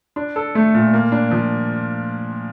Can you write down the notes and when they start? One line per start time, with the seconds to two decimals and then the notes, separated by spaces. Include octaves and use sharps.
0.16 D4
0.36 A4
0.55 A3
0.74 A#2
0.93 A#3
1.12 D4
1.31 F3